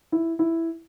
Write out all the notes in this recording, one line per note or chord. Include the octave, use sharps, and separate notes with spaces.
E4
E4